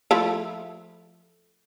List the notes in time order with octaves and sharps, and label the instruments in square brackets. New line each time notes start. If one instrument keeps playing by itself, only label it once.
[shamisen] F3 A3 E4